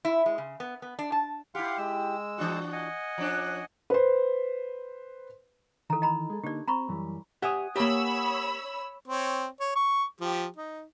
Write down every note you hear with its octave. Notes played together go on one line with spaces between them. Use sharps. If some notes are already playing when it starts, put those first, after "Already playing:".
E4
G#3
C#3
B3
B3
D4
A5
E4 G4 F5 F#5 C6
G#3 E6
E3 D4 F#4
D#5 F#5 G#5
F3 C#4 D4
B4 C5
D#3 E3 A4 A#5
D#5 A#5 B5
G#3 A4
D3 A#3 D#4 G4 D5
C4 A#5 B5 C#6
F#2 E3 G3
G4 C#5 E5 F#5 G#5 D#6
A#3 G4 C#5 B5 E6
C4 C#5
C#5
C#6
F3 G4
D#4